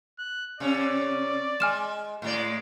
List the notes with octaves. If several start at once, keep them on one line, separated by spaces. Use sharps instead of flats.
F#6
C3 C#4 D5
G#3 G#5 F6 E7
A2 G#3 D5